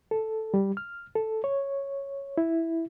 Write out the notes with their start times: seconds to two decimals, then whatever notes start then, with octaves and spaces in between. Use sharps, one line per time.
0.11 A4
0.54 G3
0.77 F6
1.15 A4
1.44 C#5
2.37 E4